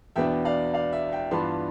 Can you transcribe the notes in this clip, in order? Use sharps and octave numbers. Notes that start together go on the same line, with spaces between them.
E2 B2 B3 D4 E5 G5
D5 F5
D5 F5
E5
E5 G5
G2 E3 B3 D4 F4 A5 C6